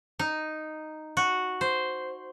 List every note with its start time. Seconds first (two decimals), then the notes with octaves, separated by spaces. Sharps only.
0.19 D#4
1.17 F#4
1.61 C5